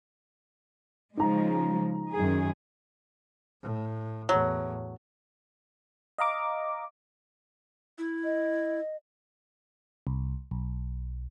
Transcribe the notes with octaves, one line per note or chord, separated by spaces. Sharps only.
C#3 F3 G#3 D#4 A#5
F#2 D#3 G#4
A2
E2 A2 F#3
D#5 F5 A#5 D6
E4
D#5
C2
B1